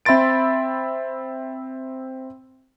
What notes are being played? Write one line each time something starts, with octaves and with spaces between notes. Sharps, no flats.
C4 E5 B5 C6 A6 D7